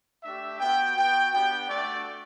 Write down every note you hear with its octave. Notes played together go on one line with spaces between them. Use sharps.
A3 D4 G4 E5
B3 F#4 G5
B3 F#4 G5
B3 D4 G4 G5
A3 D4 F#4 D5